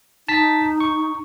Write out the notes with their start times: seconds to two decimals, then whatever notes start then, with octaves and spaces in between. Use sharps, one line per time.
0.28 D#4 A5 B6
0.80 C#6